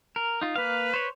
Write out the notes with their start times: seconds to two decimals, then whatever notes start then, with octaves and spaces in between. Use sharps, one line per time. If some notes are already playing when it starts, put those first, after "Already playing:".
0.16 A#4
0.41 D#4 F4
0.56 A#3 B4 F5
0.94 C5 C#5